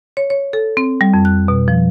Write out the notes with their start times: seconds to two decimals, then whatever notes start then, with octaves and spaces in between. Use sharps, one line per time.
0.17 C#5
0.30 C#5
0.53 A4
0.77 C4
1.01 G3
1.14 F2
1.25 F#6
1.48 B2
1.68 F3